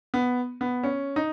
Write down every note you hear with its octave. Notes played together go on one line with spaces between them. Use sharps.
B3
B3
C#4
D#4